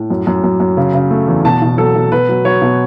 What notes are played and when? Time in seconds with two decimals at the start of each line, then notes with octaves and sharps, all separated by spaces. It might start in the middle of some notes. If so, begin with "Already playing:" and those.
Already playing: A2
0.10 F#2
0.27 F#2
0.44 F#2
0.60 F#2
0.77 C#3
0.94 C#3
1.11 A3
1.28 E2
1.45 B2 A5
1.62 B2
1.78 F#3 A4
1.95 B2
2.12 B2 B4
2.29 F#3
2.45 F#3 C#5
2.62 B2